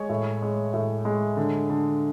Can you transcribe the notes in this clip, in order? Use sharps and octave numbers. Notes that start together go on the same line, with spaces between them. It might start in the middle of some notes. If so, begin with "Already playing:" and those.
Already playing: G#3 C#5 D#5
A2
G#3
A2
G#3
D3
D3